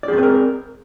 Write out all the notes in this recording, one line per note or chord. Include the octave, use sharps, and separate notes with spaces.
C4 G#4 A#4 B4 D5